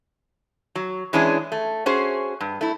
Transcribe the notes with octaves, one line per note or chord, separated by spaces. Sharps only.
F#3
E3 G#3 C#4 D4 E4 G#4
A3
C#4 F#4 G#4 C5
G2
A3 E4